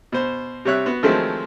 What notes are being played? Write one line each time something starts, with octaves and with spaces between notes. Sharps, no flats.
B2 C5
C3 G3 C#5 E5 F#6
B3 F#4
D#3 F3 F#3 G#3 A3 C4